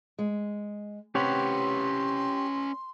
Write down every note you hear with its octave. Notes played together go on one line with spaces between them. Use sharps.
G#3
C3 C#4 G4 B4 C#5 F#5 C6